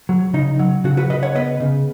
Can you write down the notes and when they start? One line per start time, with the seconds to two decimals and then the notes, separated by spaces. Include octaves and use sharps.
0.09 F#3
0.33 C#3 D#4
0.59 F#3
0.84 C#3 F#4
0.97 F#4 B4
1.09 C#3 B4 D#5
1.23 C#5 F#5
1.35 B3 B4 D#5
1.60 C#3